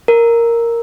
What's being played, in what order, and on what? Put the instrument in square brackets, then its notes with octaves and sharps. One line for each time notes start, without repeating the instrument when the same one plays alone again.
[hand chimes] A#4